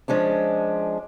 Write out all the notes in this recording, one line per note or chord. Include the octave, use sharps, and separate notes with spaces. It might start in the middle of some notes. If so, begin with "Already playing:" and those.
F3 G#3 C#4 D4